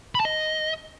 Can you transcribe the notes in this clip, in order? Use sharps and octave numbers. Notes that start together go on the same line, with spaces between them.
B5
A5
D#5